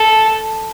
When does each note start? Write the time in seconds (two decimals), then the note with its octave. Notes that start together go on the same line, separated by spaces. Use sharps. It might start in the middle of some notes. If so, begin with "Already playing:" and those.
Already playing: A4